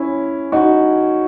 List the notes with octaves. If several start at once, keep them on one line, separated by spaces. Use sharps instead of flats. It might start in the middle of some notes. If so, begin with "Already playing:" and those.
Already playing: C#4 E4
D#4 F#4